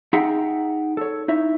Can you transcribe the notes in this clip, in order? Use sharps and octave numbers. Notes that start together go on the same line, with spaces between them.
D#4 G#4 E5 F#5 G5 A#5
A4 C#5
D#4 E4 C#5 E5